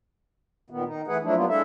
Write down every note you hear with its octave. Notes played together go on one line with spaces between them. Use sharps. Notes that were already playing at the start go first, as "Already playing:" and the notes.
A#2 D#3 B3
D#3 D#4
E3 A3 G#4 B4 F#5
F3 F#3 A3 D4 E4
F#3 G3 A#3 B3 F4
G#3 D4 E4 A4 E5